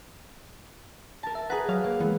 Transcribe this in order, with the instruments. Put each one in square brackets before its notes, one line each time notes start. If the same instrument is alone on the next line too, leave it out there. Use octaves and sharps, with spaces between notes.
[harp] A#4 A5
[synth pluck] E5
[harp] G#4 B4 [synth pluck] F#5 A#5 D#6
[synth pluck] F#3 C#5 [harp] F5
[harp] A#3 [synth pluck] F5
[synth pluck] E3 G#3 [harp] B3